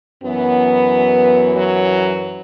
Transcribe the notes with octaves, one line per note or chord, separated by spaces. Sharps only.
F#2 E3 F#3 B3
F#3